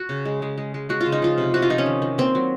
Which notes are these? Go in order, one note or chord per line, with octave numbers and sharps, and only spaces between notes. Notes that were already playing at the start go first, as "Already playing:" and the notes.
Already playing: F#4
C#3
G#3
G#3
G#3
G#3
G#3 F#4
F4
C#3
D#4
F3 F4
C3
C3 F#4
F4
F3 D#4
C#4
D#3
D#3
A#3 C4
F#3